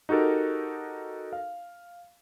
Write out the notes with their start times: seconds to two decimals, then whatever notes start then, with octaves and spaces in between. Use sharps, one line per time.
0.09 D#4 F#4 G4 A4 A#4
1.33 F5